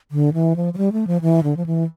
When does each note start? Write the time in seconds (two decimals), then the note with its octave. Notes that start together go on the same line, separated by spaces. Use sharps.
0.11 D3
0.34 E3
0.56 F3
0.74 F3
0.78 G3
0.92 A3
1.07 F3
1.21 E3
1.43 D3
1.57 F3
1.66 E3